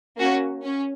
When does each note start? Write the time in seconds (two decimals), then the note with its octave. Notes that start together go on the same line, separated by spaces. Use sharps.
0.18 A#3 C#4 F#4
0.64 C#4